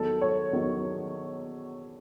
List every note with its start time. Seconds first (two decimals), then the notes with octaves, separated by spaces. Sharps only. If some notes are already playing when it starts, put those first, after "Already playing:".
Already playing: E2 D#3 F#3 A4
0.21 C#5
0.53 E2 D#3 F#3